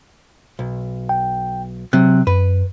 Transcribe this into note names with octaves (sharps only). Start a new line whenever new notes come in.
B1
G5
C3 F#3 C4 F#6
F#2 B4